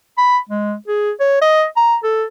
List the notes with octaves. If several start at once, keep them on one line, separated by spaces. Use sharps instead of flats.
B5
G#3
G#4
C#5
D#5
A#5
A4